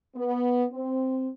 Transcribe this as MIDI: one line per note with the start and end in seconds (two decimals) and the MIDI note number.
0.16 0.65 59
0.71 1.29 60